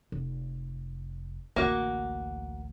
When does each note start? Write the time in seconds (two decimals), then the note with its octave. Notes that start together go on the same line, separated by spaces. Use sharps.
0.12 F1
1.56 A1 D2 A#3 F#4